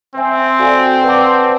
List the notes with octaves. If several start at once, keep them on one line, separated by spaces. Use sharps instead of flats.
C4 C5 E5 G#5
F#4 A4 D5 F5 G#5
B4 D5 F#5 A5 D6